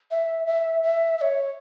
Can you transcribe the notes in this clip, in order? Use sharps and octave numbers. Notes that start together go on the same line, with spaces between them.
E5
E5
E5
E5
C#5